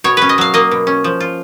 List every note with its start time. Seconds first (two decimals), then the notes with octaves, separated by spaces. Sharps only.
0.04 B2 C#5
0.17 C#4 B4
0.29 D#5
0.38 F#3 F5
0.54 A#3 D#5
0.71 B2
0.87 C#4
1.04 F3
1.20 F4